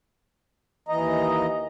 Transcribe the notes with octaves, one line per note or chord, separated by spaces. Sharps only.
D#2 E3 D#5 A#5